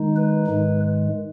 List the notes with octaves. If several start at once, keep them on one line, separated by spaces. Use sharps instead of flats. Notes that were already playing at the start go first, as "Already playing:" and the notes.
Already playing: D#3 G#3 D#4
B4
G#2 D#3 G#3